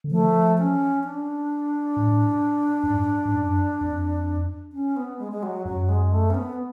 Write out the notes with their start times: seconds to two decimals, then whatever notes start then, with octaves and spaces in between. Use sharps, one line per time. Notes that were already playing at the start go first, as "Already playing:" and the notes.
0.04 D3
0.11 F3 A3
0.58 C#4
1.04 D4
1.96 A2
2.83 F#2
2.89 G#2
3.25 G#2
3.35 F#2
3.81 F2
4.73 C#4
4.96 B3
5.19 G#3
5.32 G#3
5.43 F#3
5.65 F#2 F#3
5.89 G#3
6.12 A3
6.30 C#4
6.34 B3